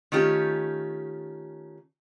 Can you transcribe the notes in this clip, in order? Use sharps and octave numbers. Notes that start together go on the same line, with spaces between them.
D#3 A3 C#4 F4 G4